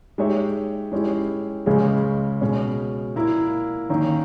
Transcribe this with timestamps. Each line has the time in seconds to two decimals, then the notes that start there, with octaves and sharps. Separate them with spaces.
0.18 G#3 D#4 G4 C#5 E5
0.92 G#3 C#4 E4 G4
1.66 C#2 C#3 G#3 C#4 G#4
2.41 B2 G#3 C#4
3.16 A#2 A#3 E4
3.90 D#3 A#3 C#4